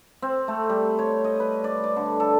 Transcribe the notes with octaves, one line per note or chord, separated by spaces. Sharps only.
C4
A3
G3
C#5
D#5
B4
D5
D5
D3
A4